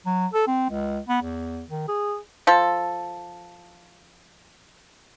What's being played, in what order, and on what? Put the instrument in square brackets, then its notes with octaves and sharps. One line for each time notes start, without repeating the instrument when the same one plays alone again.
[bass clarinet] F#3
A4
C4
C#2
B3
E2
D#3
G#4
[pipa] F3 A4